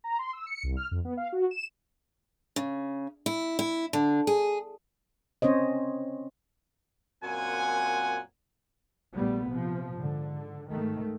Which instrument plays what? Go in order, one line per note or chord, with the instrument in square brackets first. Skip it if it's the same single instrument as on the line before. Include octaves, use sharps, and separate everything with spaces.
[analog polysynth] A#5
C6
E6
C#7
C2
F6
F2
B3
F5
F#4
E7
[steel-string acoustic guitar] C#3
E4
E4
D3
G#4
[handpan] C4 C#4 C5 C#5 D#5
[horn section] F#2 A#2 C4 F#5 G#5
[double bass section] A#1 G3 A3 B3
C3 F3
G#2 D3
G#2 D#3 A3